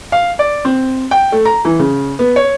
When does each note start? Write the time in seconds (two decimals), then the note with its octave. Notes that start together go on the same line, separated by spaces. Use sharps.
0.12 F5
0.39 D5
0.65 C4
1.11 G5
1.32 A3
1.45 A#5
1.65 E3
1.79 C#3
2.19 B3
2.36 C#5